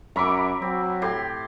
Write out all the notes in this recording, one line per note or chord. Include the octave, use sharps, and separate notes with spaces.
F#2 E5 A#5 B5 C#6 D6
F#3 C4
A2 G4 C6